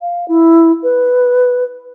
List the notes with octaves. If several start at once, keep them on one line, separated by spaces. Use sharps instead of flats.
F5
E4
B4